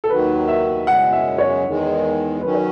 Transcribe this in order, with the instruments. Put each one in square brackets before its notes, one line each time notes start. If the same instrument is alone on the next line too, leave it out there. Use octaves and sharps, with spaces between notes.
[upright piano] A4
[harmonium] D#2 D#3 F#3 [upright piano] B4
[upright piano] E5
[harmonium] F#2 C#3 G#3 [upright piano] F#5
[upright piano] E5
C#5
[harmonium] E2 D#3 G#3
[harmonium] D#3 F#3 C#4 [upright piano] B4
[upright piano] C#5